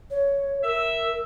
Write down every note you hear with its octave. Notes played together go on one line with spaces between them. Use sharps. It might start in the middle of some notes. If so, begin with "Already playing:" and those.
C#5
A#4 E5